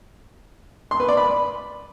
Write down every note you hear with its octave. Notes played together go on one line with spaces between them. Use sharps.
C6
B4
D5
B5